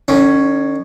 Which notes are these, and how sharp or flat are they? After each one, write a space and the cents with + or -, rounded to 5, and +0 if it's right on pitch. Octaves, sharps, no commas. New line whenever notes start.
D#3 -45 C#4 +0